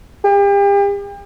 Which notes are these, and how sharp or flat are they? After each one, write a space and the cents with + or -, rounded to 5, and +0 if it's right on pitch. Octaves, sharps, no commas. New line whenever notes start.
G4 +40